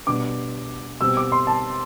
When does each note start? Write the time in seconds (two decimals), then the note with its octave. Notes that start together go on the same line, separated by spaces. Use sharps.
0.07 B2 G3 B3 D4 D6
1.01 B2 G3 C4 E6
1.17 D6
1.32 C6
1.47 A5